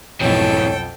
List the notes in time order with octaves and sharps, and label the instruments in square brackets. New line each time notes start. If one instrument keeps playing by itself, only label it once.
[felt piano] B1 F2 [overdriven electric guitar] G#2 E3 [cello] A4 G5 [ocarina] C#5